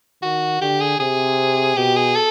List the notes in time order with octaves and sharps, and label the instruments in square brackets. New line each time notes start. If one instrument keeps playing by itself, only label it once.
[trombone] D#3 [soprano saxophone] F#4
[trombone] D3 [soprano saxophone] G4
[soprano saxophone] G#4
[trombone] C3 [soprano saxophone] G#4
[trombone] B2 [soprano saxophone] G4
[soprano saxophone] G#4
A4